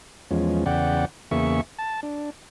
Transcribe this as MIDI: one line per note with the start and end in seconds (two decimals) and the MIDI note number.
0.31 0.64 40
0.31 0.64 53
0.31 0.64 56
0.31 0.64 61
0.66 1.05 40
0.66 1.05 49
0.66 1.05 74
0.66 1.05 78
0.66 1.05 79
1.31 1.61 40
1.31 1.61 49
1.31 1.61 58
1.31 1.61 68
1.31 1.61 76
1.31 1.61 85
1.79 2.00 81
2.03 2.30 62